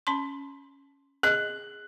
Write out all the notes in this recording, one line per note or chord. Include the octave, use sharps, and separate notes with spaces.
C#4 A5 C6
G#4 D#5 F#6